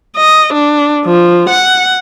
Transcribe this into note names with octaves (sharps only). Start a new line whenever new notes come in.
D#5
D4
F3
F#5